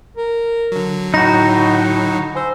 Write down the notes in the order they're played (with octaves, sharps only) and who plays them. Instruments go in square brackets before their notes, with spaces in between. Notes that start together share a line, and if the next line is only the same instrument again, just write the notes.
[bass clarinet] A#4
[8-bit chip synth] D3 F#3
[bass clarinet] A2 [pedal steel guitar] D#4 F#4 [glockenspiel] B5 G6 A#6
[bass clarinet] C5 [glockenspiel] G#5 E6